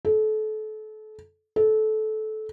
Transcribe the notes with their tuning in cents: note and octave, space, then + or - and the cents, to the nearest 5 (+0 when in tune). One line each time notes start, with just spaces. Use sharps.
A4 -30
A4 -20